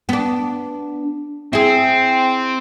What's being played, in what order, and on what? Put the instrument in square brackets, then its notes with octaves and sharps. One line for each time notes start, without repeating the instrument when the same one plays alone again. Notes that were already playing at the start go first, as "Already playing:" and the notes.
[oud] B3 D4
[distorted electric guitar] C4 [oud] E4 G#4